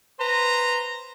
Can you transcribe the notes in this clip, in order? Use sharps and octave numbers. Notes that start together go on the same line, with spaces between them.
B4 C5 A#5